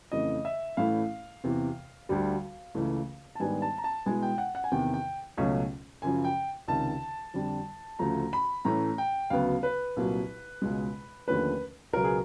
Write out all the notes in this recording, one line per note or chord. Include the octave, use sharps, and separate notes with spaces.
F2 C#3 E3 A3 D#5
E5
A2 E3 A3 C#4 E4 F5
E2 C3 E3
D2 D3 G3
C#2 C#3 E3 A3
A5
G#2 D#3 G3 B3 D4 G#5
A5
A#5
A5
B2 G#3 B3 E4 G#5
G5
F#5
F#5
G#5
E2 C3 D#3 G5
G5
C#2 B2 F#3 A3 C#4
F#2 C#3 F3 G#5
G5
C#2 C3 D#3 A5
F2 D3 G3
D2 C#3 F3 A3 A#5
B5
A2 E3 A3 C#4 A#5
G5
D2 C#3 F#3 B3 F5
B4
C2 A#2 F#3
C#2 B2 G#3
D#2 D3 F3 A3 C#4 B4
C#2 B2 F#3 B3 A#4
G#4